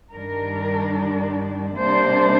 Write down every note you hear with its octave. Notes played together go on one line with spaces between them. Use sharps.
G2 D#3 G3 D4 A#4
C3 G3 A#3 D4 C5